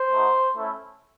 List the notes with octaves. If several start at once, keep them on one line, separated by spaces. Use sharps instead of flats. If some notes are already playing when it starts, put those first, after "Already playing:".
Already playing: C5
A3 D#4 F#4
A3 C#4 E4